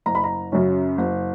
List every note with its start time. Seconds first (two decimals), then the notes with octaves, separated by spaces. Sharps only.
0.06 F#1 A#5
0.15 B5
0.24 A#5
0.52 F#2 C#3 F#3 C#4
0.98 F#1